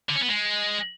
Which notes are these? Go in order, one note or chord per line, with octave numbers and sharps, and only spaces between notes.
D3
C#4
B3
G#3